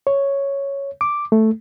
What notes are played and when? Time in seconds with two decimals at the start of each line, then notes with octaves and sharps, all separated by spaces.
0.07 C#5
1.01 D6
1.32 A3